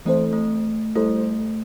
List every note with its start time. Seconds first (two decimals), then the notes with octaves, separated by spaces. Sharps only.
0.06 E3 A3 C4 E4 A4 C5
0.33 A3
0.95 G3 A3 E4 A4 C5